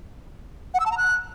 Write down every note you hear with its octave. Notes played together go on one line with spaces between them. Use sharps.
F#5
E6
A5
A#5
F#6